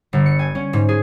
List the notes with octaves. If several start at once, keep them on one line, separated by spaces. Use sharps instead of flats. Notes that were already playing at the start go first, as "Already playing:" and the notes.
G1
C#7
G#5
C#4
G#2
G#4